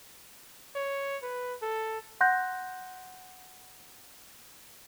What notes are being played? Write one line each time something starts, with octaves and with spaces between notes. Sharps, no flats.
C#5
B4
A4
F#5 C6 F#6 G6 A#6